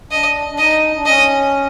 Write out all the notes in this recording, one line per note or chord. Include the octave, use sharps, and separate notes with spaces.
D4 D#5
D4
D#4 D#5
D4
C#4 D#5